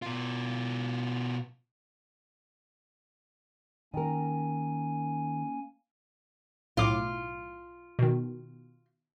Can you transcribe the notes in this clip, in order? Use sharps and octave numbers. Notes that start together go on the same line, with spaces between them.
B2 F4
D#3 A#3 C#4 A#4 G#5
B1 A2 F4 D6
B2 D#3